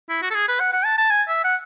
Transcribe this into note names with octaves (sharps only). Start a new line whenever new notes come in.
E4
F#4
A4
G#4
B4
F#5
F#5
A5
A5
G#5
E5
F#5